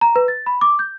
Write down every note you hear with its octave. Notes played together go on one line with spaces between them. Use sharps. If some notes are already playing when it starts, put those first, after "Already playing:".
A#5
B4
A6
B5
D6
G6